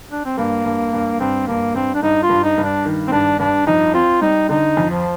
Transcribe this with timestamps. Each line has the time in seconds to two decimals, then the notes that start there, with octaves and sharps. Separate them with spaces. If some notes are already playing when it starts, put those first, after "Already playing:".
0.11 D4
0.25 C4
0.37 G2 A#3
0.65 G2
0.93 G2
1.20 G2 C4
1.47 G2 A#3
1.74 G2 C4
1.95 D4
2.03 G2 D#4
2.23 F4
2.29 G2
2.44 D#4
2.58 G2
2.64 D4
2.85 D#3
3.08 C4
3.12 G2 D4
3.39 G2 D4
3.67 F2 D#4
3.94 C4 F4
4.22 G3 D#4
4.49 D3 D#4
4.77 F2
4.90 F3